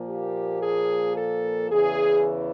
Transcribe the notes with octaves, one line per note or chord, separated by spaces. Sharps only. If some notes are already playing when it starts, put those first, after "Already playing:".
Already playing: A#2 F3 A#3
G4
G#4
A4
E2 C#3 E3 G#4